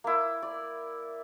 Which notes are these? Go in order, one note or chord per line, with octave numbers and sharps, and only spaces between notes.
A#3 E4
D5